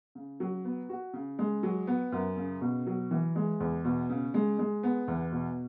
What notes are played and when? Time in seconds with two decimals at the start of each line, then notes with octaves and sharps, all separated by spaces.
0.15 C#3
0.40 F#3
0.65 B3
0.89 F#4
1.13 C#3
1.39 G#3
1.63 F#3
1.87 B3
2.12 F#2
2.37 C#3
2.61 B2
2.87 F#3
3.11 E3
3.36 G#3
3.60 E2
3.85 B2
4.10 C#3
4.34 G#3
4.59 G#3
4.83 B3
5.08 E2
5.32 B2